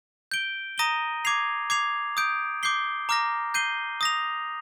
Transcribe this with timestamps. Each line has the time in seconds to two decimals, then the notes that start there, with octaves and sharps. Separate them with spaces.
0.31 G6 D7 G7
0.78 A#5 D#6 A#6 D#7 G7
1.25 D6 G#6 C7 F7
1.70 D6 G#6 C7 F7
2.17 D#6 G6 D7
2.63 D6 G6 C7 G7
3.09 A#5 D6 F6 A#6
3.54 G6 C7 D#7 G7
4.01 D#6 A#6 F7